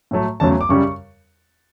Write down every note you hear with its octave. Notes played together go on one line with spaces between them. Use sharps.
A2 F#3 A3
E2 C#3 F#3 A3 A5
D6
F#2 C#3 G3 C#6